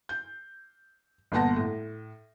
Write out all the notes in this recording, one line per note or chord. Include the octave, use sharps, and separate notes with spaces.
G6
G1 A#2 B3 F#5 A5 A#6
A2